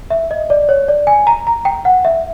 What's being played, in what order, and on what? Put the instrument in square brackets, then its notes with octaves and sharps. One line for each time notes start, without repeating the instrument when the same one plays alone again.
[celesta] E5
D#5
D5
C#5
D5
G#5
A#5
A#5
G5
F#5
E5